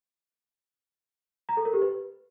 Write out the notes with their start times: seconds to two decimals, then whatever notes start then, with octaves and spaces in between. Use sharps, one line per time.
1.49 A#5
1.57 A4
1.65 A#4
1.73 G4
1.82 B4